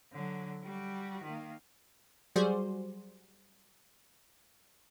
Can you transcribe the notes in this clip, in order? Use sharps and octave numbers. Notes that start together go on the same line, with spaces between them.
D3 F#3
G3 F#4
D#3 A#3
F#3 G3 F#4 G#4 C5 D5